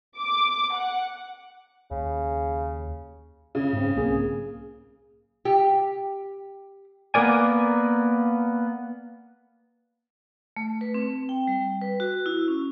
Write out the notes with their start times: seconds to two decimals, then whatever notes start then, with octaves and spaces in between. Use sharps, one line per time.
0.18 D6
0.75 F#5
1.91 D#2 C#3
3.55 C#3
3.73 G#2 C4
3.96 B1 A#3 G#4
5.45 G4
7.14 A#3 B3 A#4 D5 G#5
10.56 A3
10.81 B4
10.94 C4
11.29 G5
11.47 G3
11.81 B4
12.00 F#4
12.26 E4
12.48 C#4